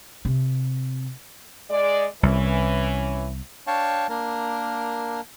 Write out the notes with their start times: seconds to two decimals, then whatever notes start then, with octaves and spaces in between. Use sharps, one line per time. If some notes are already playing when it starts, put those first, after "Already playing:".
0.25 C3
1.70 G#3 D5
2.23 C2 E3 C#4
3.67 D4 C#5 F5 G5 A5 C#6
4.09 A#3 D4 A#4